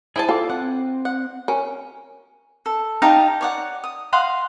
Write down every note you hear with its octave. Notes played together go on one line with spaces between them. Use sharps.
E4 G#4 C5 G#5 A5
F4 A4 F5 D6
C4 F#5
F#5
C#4 A#4
A4
D#4 G4 F5 A5
C#5 D5 F#5
D#6
D#5 F5 F#5 C6